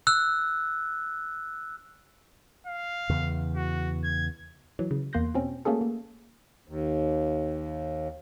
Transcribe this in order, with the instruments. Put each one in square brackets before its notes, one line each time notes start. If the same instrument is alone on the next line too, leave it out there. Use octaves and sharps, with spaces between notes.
[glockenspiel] E6 F#6
[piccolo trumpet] F5
[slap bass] E2 C#3 E3
[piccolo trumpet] F#4
G#6
[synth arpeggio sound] E3 F#3
C#3
E2 A#3 C6 F#6 G6 A#6
B2 C4 C#4
A3 A#3 C#4 F#4 G#4 A4
A#3
[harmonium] D#2